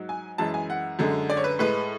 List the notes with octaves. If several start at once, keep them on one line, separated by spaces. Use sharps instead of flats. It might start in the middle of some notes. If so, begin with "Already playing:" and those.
Already playing: G#2 F#3
G#5
F#2 E3 G#3 A5
G#5
F#5
F#2 D3 G#3
D5
C#5
B4
A2 G#3 B4